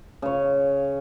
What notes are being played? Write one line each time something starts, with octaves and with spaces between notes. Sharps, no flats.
C#3 C#5